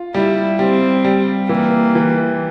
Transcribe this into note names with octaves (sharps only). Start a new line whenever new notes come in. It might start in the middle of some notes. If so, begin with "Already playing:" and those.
Already playing: F4
G3 E4
G3 C4
G3
E3 A#3
E3